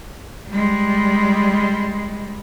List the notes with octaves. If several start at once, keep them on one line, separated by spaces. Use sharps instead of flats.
G3 G#3